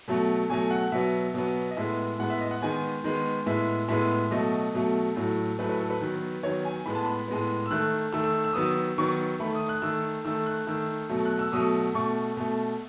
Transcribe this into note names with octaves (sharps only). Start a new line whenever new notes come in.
B2 F#3 A3
B2 F#3 A3 G#5
F#5
B2 F#3 B3 E5
B2 F#3 B3
D#5
A2 G#3 B3 E5
A2 G#3 B3 F#5
E5
D#5
F#5
D#3 G#3 B3 G#5
D#3 G#3 B3
A2 G#3 B3 E5
A2 G#3 B3 E5
B2 F#3 A3 D#5
B2 F#3 A3
A2 F#3 A3
A2 F#3 A3 B4
B4
A4
B4
D#3 F#3 B3
D#3 F#3 B3 C#5
G#5
A2 G#3 B3 B5
A5
B5
A2 G#3 B3
E6
D#3 A3 F#6
D#3 A3 E6
E6
E6
D#3 F#3 B3 D#6
E6
D#3 F#3 B3 C#6
D#3 A3 B5
D#6
F#6
D#3 A3 E6
D#3 A3 E6
F#6
D#3 A3 E6
B2 F#3 A3
F#6
E6
B2 F#3 A3 D#6
B2 A3 C#6
B2 A3